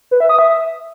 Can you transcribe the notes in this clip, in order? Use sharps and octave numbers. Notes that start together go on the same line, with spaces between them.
B4
E5
D#6
E5